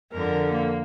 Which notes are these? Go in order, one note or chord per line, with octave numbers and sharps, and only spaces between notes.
F2 D3 A#4
A#3